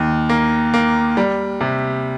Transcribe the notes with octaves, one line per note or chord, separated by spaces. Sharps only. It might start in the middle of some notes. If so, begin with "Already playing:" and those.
Already playing: D#2
A#3
A#3
G3
C3